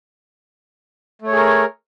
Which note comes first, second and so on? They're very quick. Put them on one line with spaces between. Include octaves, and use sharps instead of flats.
A3 C#5 G#4 A#4